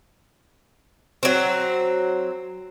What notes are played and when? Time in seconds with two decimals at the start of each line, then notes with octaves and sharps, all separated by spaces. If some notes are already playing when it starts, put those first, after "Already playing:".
1.23 F#3 C4